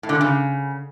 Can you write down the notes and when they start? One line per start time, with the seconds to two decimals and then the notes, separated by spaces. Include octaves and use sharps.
0.03 A2
0.09 D3
0.15 A#2
0.21 C#3